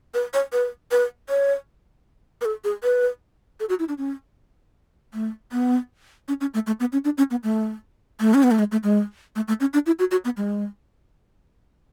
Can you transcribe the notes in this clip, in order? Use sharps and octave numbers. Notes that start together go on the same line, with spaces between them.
B4
C#5
B4
B4
C#5
B4
A4
G#4
B4
A4
F#4
E4
D4
C#4
A3
B3
C#4
C#4
A3
A3
B3
C#4
D4
C#4
B3
A3
A3
C#4
B3
A3
G#3
A3
G#3
A3
A3
C#4
D4
E4
F#4
F#4
B3
G#3